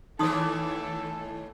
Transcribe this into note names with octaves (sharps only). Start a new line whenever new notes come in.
D#2 A2 E3 D#4 A4 C6 D#6